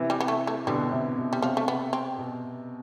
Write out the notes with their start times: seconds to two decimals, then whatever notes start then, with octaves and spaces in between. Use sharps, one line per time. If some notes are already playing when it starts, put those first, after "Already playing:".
Already playing: C3 E3
0.10 G3
0.20 B3
0.28 A3
0.47 A3
0.67 B2 D3 G3
0.91 C3
1.18 B2
1.33 G3
1.42 C3 F3
1.57 A3
1.68 B3
1.93 C4
2.18 B2